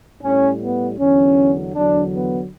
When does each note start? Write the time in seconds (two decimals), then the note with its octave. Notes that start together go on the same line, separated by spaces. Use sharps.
0.23 A2 G3 C#4
0.60 B3
0.98 E2 D3 F#3 C#4
1.74 E2 D3 F#3 D4
2.12 B3